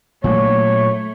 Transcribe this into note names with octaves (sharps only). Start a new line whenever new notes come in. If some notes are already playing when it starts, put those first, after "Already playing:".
A#2 F#3 A3 A#3 C#5